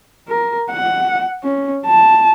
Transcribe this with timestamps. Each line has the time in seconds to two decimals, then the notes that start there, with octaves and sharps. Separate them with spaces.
0.28 A#4
0.71 F#5
1.43 C#4
1.86 A5